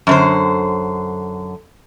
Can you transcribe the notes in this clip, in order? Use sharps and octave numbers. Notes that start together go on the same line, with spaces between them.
F#2 D3 C5